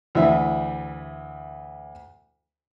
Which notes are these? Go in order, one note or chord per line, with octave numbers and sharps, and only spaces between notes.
D2 E3 E5